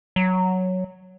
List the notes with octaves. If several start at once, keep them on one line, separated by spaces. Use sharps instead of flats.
F#3